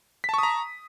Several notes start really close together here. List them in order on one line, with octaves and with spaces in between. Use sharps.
B6 A5 C#6 D#6 A#5